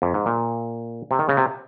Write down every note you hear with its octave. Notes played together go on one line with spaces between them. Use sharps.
F2
G#2
A#2
C3
D#3
C#3
C3